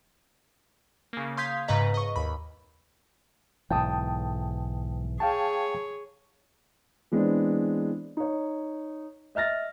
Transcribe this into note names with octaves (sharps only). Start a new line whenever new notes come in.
C#3 A#3
F5 C6 D#6 G6 G#6 B6
G#2 C#3 B4 D#5 A#5 B6
D#5 C#6
D#2 B5
B1 G#2 E3 G5 A5 D#6
G#4 C#5 F5 G5 A5
E3 G#3 B3 C4 D4
D#4 C#5
D#5 E5 F6 A6 A#6